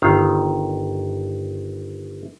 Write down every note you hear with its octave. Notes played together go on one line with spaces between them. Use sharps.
G1 D#3 F5